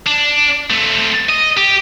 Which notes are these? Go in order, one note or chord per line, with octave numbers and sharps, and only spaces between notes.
D4
A3 C4
D#5
G4